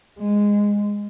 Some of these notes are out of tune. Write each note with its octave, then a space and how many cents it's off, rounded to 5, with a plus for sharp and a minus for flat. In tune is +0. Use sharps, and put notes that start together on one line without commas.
G#3 -10